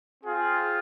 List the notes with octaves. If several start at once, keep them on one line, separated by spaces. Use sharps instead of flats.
C4 F4 G#4